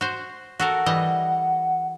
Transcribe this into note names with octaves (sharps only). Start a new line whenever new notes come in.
F#4 C5
F#4 A4 A#4 F#5
E3 G3 D#5